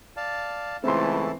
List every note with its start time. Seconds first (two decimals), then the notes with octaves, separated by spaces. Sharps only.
0.17 D5 F5 A5
0.84 C#2 E3 A3 C4 E4 A4 A5 C6